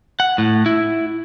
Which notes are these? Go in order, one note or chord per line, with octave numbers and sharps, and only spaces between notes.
F#5
A2
E4